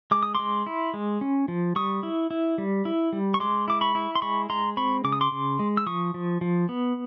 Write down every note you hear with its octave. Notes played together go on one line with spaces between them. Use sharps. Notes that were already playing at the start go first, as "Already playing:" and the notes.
G#3 D6
D#6
G#3 C6 D6
E4
G#3
C#4
F3
G3 C#6 D#6
E4
E4
G3
E4
G3
C#6
G#3 C6 D6
E4 D6
B5 C#6
E4
C6
G#3 B5 C#6
G#3 A#5 C6
C4 B5 C#6
C#3 D6
D#6
C6 D6
C#3
G#3
E6
F3 C#6 D#6
F3
F3
B3